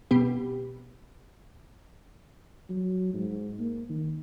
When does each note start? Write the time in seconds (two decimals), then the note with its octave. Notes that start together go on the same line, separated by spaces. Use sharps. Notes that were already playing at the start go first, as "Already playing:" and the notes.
0.11 B2 B3 G4
2.70 F#3
3.13 G#2
3.59 A#3
3.89 D#3